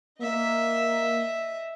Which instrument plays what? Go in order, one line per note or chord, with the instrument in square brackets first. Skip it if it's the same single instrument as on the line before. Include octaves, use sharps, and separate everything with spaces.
[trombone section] A#3 [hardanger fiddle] D#5 E5